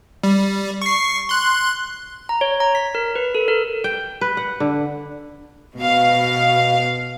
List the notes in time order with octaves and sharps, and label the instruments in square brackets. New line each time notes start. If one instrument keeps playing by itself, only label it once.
[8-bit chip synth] G3
C#6 C7
C6 F#6
[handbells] A#5
C#5
A#5
B6
A#4
B4
A4
A#4
[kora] G5
B4
F#5
D3
[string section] B2 F5